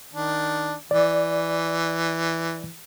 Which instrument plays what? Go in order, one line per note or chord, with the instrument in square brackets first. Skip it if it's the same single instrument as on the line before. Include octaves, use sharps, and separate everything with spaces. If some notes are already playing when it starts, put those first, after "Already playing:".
[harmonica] D#3 D4
[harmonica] E3 [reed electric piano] D5